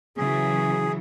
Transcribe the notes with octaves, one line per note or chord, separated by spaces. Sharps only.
C#3 E3 F#3 G#4